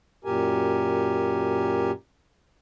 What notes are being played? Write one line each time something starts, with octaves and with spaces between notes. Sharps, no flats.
F#2 A#2 G4 A#4 G#5